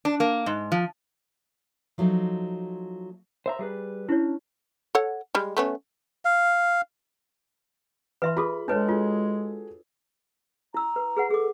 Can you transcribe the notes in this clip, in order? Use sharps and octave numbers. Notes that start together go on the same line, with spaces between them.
D4
A#3
G#2
F3
F3 F#3 A3 D#4 C5
C5 E5 A#5
G3 G#4 B4
C#4 D4 E4 C#5
A4 C#5 F#5
G3 G#3
A3 B3 C#4
F5
E3 B4 E5 C6
F4 G#4 A4 B5
G#3 D4 A4 B4 C#5 A5
F4 F#4 G#4 A4
E4 A#5 E6
B4
G#4 B4 F#5
G#4 A4 D6